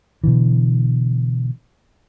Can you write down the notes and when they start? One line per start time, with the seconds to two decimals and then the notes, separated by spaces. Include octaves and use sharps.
0.24 B2 D3 E3